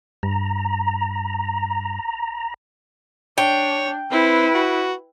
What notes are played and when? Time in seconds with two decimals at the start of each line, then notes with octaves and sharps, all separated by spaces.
0.23 G2 A#5
3.38 D4 C#5 G5
4.11 C4 E4 B4
4.54 F#4